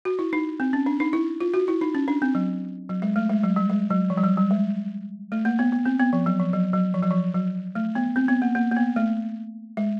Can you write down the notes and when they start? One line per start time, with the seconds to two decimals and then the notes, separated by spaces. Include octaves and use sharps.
0.05 F#4
0.19 E4
0.33 D#4
0.60 C4
0.73 C#4
0.86 D4
1.00 D#4
1.13 E4
1.40 F4
1.54 F#4
1.68 E4
1.81 D#4
1.95 C#4
2.08 D4
2.22 C4
2.35 F#3
2.89 F#3
3.02 G#3
3.16 A3
3.29 G#3
3.43 F#3
3.56 G3
3.70 G#3
3.90 F#3
4.10 F3
4.17 G3
4.24 F#3
4.37 G3
4.51 G#3
5.32 A3
5.45 A#3
5.59 B3
5.72 B3
5.85 C4
5.99 B3
6.13 F3
6.26 F#3
6.40 F3
6.53 F#3
6.73 F#3
6.94 F3
7.03 F#3
7.11 F3
7.34 F#3
7.75 A3
7.95 B3
8.16 C4
8.28 B3
8.42 A#3
8.55 A#3
8.71 A#3
8.76 B3
8.96 A3
9.77 G#3